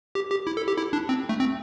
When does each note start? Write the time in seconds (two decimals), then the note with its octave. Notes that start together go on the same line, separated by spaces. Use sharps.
0.15 G4
0.31 G4
0.47 E4
0.57 A4
0.68 G4
0.78 E4
0.93 D4
1.09 C4
1.29 A3
1.40 C4